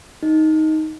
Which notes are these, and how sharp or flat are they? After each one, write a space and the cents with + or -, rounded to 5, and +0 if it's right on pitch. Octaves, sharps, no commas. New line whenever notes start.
D#4 +10